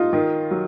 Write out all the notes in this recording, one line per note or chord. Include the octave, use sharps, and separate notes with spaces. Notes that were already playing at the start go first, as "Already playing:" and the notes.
Already playing: D#4 F4
D#3
F#3